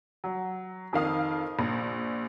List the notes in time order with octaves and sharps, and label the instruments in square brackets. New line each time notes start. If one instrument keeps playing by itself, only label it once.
[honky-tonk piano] F#3
F2 D#3 F5 D#6
A#1